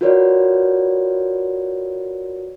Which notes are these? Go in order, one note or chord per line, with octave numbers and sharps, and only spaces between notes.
F4 F#4 A#4 B4 C#5 D5